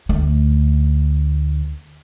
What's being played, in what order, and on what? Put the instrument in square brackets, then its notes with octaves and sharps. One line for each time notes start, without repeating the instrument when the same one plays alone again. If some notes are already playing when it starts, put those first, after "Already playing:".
[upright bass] D2 A3